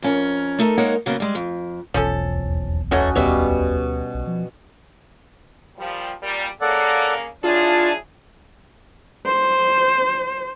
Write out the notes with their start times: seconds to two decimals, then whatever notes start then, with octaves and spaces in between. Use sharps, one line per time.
0.02 F2 C#4 A#4
0.59 A3 D#4 A4 A#4
0.78 G#3 A#3 D#4 A#4 C#5 F#5
1.06 C#3 F#3 A#3 B3 A#4
1.20 G3 G#3
1.35 F2
1.94 E1 B1 E2 F3 C#4 A4
2.35 D#2
2.91 D2 E3 F#3 A3 C#4 F#4 D#5
3.15 B2 G3 C#4 C#5 E5
4.15 B1
4.27 F3
5.77 A#2 F3 G3
6.21 A#2 G3 A#3
6.61 C#3 A#3 A4 D5 F#5
7.44 F#3 D4 E4 F4 G#4 A5
9.26 C5